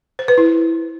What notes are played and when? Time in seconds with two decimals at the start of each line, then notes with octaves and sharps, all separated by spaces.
0.19 C5
0.28 B4
0.38 E4